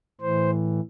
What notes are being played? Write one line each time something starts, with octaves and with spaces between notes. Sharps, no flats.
A2 E3 C5